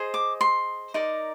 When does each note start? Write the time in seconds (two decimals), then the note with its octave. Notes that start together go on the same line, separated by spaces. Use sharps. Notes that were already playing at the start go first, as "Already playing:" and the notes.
Already playing: G#4 C5 D#5
0.14 D6
0.41 C6
0.94 D#4 A#4 D5